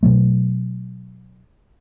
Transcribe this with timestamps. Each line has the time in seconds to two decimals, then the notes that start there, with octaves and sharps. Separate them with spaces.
0.03 B2 F#3 A3